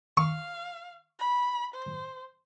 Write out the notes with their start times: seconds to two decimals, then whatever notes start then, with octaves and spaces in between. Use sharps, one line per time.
0.17 F5 C#6
1.19 B5
1.74 C5